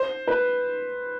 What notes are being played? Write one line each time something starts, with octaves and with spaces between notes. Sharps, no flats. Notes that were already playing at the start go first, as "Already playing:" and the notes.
Already playing: C5
B4